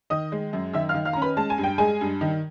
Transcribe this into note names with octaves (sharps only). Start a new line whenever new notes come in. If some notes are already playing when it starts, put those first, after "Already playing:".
D#3 D#5 D#6
G#3
F#2
D#3 E5 E6
F5 F6
D#3
F5 F6
A#5
C#4
B4 B5
G#3 A5
G#5
G2
G5
G#3 G#4 G#5
G2
D#3